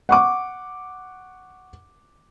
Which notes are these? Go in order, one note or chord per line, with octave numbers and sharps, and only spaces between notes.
F#5 C#6 D6